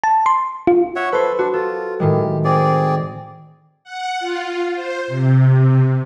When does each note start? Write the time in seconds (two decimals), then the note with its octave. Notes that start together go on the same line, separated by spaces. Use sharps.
0.04 A5
0.26 C6
0.67 F4
0.96 C#5 E5 F#5
1.12 A4 B4 C5
1.39 D4 F#4
1.54 F4 A4
2.00 A2 D#3 G#3 G4
2.44 C4 G#4 D5
3.84 F#5
4.20 F4
4.74 C5
5.07 C3